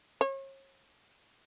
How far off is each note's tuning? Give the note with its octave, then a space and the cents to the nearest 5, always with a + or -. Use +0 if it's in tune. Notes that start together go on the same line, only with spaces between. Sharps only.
C#5 -40